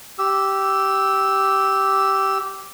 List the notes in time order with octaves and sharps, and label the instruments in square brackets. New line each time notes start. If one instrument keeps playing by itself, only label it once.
[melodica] G4 E6